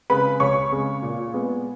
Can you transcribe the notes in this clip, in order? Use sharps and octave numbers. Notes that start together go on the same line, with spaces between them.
C#3 G#3 B4 B5
C#2 C#5 C#6
C#3 G#3
A#2
G#3 B3